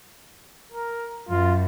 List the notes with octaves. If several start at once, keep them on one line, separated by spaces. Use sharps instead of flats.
A#4
F#2 F4